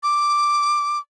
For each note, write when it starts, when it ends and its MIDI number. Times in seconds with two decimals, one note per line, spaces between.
0.03 0.99 86